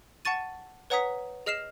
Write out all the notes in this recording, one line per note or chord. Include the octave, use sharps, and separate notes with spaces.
F#5 A5 C#6 A6 D#7
B4 C#5 F#5 A#5 D#6 B6
G#4 D#5 F6 C7 E7